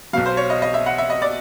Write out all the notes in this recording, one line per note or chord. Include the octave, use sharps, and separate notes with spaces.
B1 B2 F#3 F5
C5
C#5
D#5
D#5
E5
F#5
E5
D#5
D5